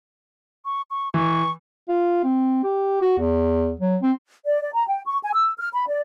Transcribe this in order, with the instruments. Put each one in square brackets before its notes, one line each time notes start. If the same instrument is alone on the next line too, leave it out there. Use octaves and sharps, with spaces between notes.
[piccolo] C#6
C#6
[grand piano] E3 [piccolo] C#6
[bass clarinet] F4
C4
G4
F#4
E2
F#3
C4
[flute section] D5
D5
A#5
G5
C#6
G#5
E6
F6
B5
D5